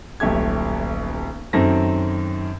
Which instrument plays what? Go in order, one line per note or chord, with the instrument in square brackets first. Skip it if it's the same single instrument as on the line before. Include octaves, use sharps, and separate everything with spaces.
[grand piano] D#1 B1 A3 G4 G#6
F#2 D#3 C4 A4 A#6